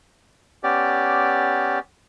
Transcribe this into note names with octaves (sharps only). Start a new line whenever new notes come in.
B3 C#4 G4 D5